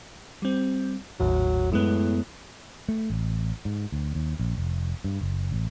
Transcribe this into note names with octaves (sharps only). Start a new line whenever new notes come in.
G3 C4
G#1 D#2 A2 F#3
F#2 A2 G#3 B3
A3
A1
G#2
D2
D#2
A#1
F1
G2
F#1
A1